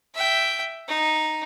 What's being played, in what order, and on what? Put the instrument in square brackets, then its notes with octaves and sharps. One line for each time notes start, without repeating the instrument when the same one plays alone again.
[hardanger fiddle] E5 G5
D#4